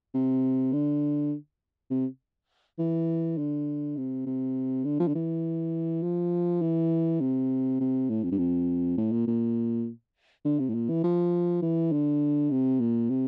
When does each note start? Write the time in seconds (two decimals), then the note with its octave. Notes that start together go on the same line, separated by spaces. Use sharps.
0.14 C3
0.73 D3
1.90 C3
2.78 E3
3.37 D3
3.97 C3
4.26 C3
4.85 D3
5.00 F3
5.08 D3
5.15 E3
6.03 F3
6.62 E3
7.20 C3
7.80 C3
8.10 A2
8.24 F2
8.32 G2
8.38 F2
8.98 A2
9.12 A#2
9.27 A#2
10.45 D3
10.59 C3
10.69 A2
10.75 A#2
10.89 E3
11.04 F3
11.62 E3
11.92 D3
12.51 C3
12.80 A#2
13.10 C3